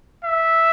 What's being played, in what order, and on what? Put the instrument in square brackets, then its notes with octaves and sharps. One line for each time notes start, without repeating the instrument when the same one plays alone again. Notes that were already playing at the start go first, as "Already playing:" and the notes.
[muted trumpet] E5